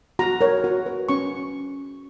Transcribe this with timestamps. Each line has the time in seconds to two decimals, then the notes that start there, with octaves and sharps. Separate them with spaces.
0.19 F#4 A#5
0.41 A#4 C#5
0.64 F#4
0.86 B4
1.09 C#4 C#6